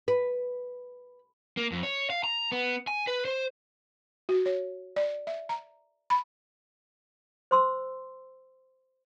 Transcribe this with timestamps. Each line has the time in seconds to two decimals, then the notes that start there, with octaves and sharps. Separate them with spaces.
0.08 B4
1.57 A#3
1.72 F2
1.83 C#5
2.10 F5
2.24 A#5
2.52 B3
2.87 G#5
3.07 B4
3.25 C5
4.29 F#4
4.46 C#5
4.96 D5
5.27 E5
5.49 A#5
6.10 B5
7.51 C5 C6 E6